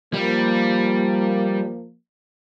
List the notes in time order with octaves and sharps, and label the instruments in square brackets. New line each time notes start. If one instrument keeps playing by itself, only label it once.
[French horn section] F3 A#3 [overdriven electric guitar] G3